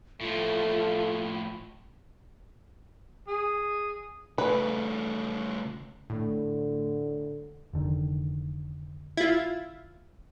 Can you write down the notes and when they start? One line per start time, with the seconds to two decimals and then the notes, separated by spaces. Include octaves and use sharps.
0.21 A2 F3 A3 F4
3.28 G#4
4.38 C#3 A3 B4
6.10 A2 D3
7.73 F1 D3 D#3
9.17 E4 F4